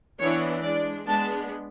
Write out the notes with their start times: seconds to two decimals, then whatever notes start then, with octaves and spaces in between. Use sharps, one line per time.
0.20 E3 B3 D4 C#5
0.63 G#3 D4 D5
1.07 G#3 B3 D4 A5